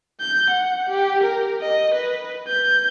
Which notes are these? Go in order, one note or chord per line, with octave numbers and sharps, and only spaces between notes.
G6
F#5
G4
A#4
D#5
B4
G6